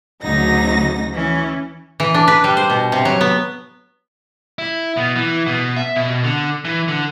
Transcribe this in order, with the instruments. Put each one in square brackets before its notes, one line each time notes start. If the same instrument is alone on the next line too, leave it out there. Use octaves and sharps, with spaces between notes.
[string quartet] D2 C#3 F#3 D#4 A#6
E3 C#4
[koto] E3
D4
B4
G3
C5
B2
C3
F#3
B3
[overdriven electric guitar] E4
B2
E3
B2
E5
B2
D3
E3
D3